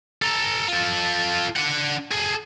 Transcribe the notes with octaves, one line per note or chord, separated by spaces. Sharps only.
A4 A#5
F4 A4
D4 F#5
G#4 A4